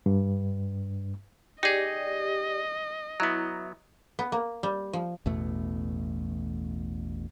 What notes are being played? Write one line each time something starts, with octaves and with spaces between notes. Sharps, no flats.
G2
D#4 G4 G#4 D5 D#5
F#3 B3 E4 A#5
B3
A#3
G3
F3
A1 E2 B2 A3